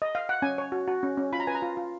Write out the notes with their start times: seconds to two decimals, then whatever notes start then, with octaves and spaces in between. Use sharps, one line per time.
0.02 D#5
0.15 F5
0.29 F#5
0.42 C#4 G#5
0.58 C#5
0.72 F#4
0.88 F#4
1.03 C#4
1.17 C#4
1.33 F4 B5
1.40 A#5
1.47 B4 G#5
1.55 A#5
1.62 F4
1.77 F4